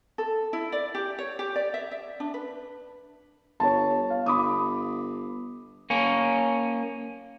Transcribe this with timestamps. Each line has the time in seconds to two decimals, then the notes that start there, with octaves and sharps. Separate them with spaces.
0.18 A4
0.53 E4
0.72 D5
0.95 G4
1.19 C#5
1.39 G4
1.56 D5
1.74 E5
1.92 E5
2.20 D4
2.34 B4
3.60 G1 C#5 A5
4.10 F5
4.26 G1 B5 D6 D#6
5.90 A#3 C#4